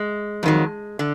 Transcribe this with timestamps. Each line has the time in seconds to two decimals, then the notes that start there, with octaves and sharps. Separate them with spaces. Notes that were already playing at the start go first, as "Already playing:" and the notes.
Already playing: G#3
0.43 F2 D#3 F#3
0.99 D3